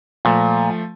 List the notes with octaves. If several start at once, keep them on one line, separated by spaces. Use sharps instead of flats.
A#2 F3 A3